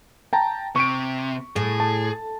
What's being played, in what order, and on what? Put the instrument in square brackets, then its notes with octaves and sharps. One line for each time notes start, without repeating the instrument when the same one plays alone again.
[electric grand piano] G5 A5 A#5
[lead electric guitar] C3 [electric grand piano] C#6 D7
[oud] A2 [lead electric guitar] G#4
[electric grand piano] A5